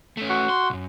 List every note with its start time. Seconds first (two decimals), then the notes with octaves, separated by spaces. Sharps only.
0.17 A3 C#4
0.30 F#4
0.49 C6
0.70 B1 F#2